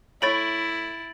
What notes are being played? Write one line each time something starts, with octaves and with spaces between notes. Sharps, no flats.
A3 E4 C#5 B5 A6 D7 F#7